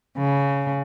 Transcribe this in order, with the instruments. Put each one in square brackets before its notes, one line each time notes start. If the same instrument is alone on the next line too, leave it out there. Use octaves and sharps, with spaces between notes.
[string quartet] C#3